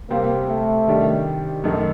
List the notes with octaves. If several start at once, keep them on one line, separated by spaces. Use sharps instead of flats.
C3 G3 A#3 C4 G4
A3
C3 D#3 G3 D4 G4
F#2 D#3 A3 D#4 A4